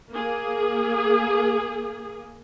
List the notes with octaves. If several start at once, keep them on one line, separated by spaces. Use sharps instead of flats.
A#3 G#4